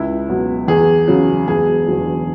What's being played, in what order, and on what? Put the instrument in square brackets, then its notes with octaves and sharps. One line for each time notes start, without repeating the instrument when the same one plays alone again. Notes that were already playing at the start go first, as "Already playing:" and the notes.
Already playing: [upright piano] C#2 E4
B2 F#3
E2 G#4
C#3 F#3
E1 G#4
E2 D3 F#3